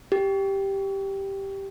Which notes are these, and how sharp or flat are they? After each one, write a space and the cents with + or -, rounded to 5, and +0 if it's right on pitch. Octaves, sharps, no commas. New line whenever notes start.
G4 +0